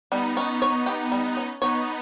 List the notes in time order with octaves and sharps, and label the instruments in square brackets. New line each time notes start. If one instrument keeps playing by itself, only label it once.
[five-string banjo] G3 [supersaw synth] B3 D#4
[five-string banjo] C#4
C#5
G4
G3
C#4
[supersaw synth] B3 D#4 [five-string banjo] C#5